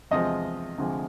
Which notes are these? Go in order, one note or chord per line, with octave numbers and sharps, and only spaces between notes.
E2 C3 F3 G#3 D#5
D2 C3 F3 G#3